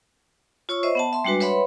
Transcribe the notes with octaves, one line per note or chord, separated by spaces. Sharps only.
F4 C#5 C#6 E6
C5 D#5 E5
B3 F#5 A5
E5 C6
G3 G#3 D4 F#4 B4
B4 C#5 E5 F#5 B5 C6